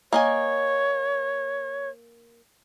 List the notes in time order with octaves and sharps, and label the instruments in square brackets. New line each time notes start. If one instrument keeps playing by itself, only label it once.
[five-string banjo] A#3 D#5 G#5 [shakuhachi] C#5